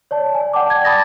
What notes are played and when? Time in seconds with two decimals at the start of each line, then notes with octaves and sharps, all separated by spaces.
0.11 C#5 D5 A5
0.35 G#5
0.53 D5 F#5 G5 A5 D6
0.70 G#6
0.84 A5 B5 D6 D#6 A6 A#6